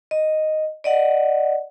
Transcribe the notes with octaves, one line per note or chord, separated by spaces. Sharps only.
D#5
D5 D#5 F#5